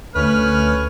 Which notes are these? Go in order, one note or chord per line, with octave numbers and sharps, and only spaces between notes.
D2 A3 C#4 B4 F6